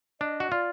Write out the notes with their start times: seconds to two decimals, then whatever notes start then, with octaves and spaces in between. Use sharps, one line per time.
0.20 D4 D#5
0.40 F#4
0.52 F4 D5